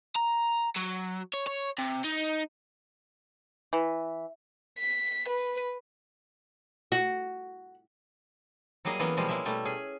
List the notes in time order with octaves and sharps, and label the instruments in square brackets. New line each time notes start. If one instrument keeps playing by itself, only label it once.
[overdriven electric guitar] A#5
F#3
C#5
C#5
C3
D#4
[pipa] E3
[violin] B6
B4
[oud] F#4
[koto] F#3 G3 A#3 G#4 D#5
E3 A#3 B3 C#4
B2 F3 G3 G#3 C#4
G#3 A#3 E4 E5
B2 G3 A3
C#4 G#4